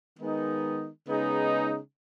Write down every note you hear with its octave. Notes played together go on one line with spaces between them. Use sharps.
D#3 G#3 B3 D#4
C#3 G#3 B3 D#4